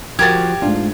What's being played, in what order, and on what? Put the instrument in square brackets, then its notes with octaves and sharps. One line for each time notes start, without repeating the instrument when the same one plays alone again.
[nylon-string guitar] F3 F#4 [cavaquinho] G4 A#4 D#6 [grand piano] G#6 A6
[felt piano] G#2 A3 D4 [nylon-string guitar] F4